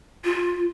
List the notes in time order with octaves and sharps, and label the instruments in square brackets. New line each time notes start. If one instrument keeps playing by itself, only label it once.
[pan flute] F4